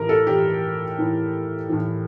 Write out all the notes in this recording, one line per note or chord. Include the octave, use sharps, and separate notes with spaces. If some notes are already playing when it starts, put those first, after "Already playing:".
Already playing: A2 E3 A#4
A4
A2 E3 G4
A2 E3
A2 E3